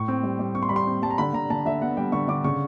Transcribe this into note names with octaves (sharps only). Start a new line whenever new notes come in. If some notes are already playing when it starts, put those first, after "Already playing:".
Already playing: A2 C#6
C4
G3
G3
C4 C#6
C6
G3 B5
C6
C4
G3 A5
A#5
D3 B5
D3 A#5
D3 A5
D3 E5
B3 F#5
G3 G5
D3 C#6
D3 D6
C#3 C#6